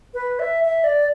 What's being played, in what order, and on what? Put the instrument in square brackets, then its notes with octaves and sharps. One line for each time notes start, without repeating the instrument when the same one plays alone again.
[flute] B4
E5
E5
D5